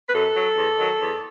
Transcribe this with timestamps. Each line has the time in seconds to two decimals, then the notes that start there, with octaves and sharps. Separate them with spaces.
0.08 B4
0.14 F#2 A4
0.35 F#3
0.57 E2
0.77 D#3 F#3
1.00 E2